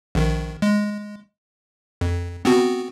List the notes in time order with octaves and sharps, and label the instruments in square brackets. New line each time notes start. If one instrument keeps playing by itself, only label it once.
[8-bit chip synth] A#1 D#3
G#3
F2
B3 C4 F#4